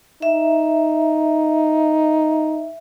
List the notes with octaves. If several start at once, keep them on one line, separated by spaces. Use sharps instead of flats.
D#4 E5